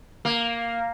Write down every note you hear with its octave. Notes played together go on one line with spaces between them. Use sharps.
A#3